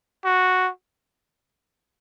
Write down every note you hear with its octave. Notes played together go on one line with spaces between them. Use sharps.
F#4